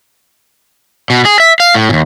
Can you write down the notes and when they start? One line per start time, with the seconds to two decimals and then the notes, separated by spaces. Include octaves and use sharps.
1.10 B2
1.25 G#4
1.40 E5
1.60 F5
1.75 A2
1.89 D#2 A#2